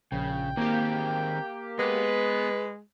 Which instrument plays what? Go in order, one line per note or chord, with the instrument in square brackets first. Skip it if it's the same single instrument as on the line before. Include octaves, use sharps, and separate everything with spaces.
[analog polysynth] A#1 [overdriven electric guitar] C#3 [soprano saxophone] G5
[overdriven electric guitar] D#3 C4 [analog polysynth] A#3 G4
[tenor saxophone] G#3 [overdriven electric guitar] B3 [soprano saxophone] B4